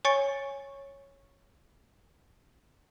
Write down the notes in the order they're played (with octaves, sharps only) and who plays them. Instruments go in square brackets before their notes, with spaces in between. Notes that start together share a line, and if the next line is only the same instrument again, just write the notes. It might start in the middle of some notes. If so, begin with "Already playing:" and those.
[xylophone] C#5 G#5 C#6 A6 C#7